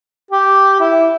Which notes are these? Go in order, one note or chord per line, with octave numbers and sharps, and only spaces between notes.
G4
E4